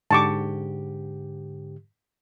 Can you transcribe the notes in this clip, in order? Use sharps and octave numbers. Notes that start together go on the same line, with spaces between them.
G#2 D3 G4 A5 C#6 D6